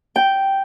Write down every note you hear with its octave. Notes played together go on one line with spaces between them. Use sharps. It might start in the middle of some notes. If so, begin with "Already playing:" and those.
G5